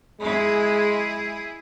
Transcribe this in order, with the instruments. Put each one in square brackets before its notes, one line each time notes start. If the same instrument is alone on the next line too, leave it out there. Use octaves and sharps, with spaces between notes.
[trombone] G#3 [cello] E4 G#4